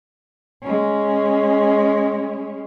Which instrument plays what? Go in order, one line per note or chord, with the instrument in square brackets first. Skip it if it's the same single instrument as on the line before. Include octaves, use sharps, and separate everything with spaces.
[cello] G#3 C#4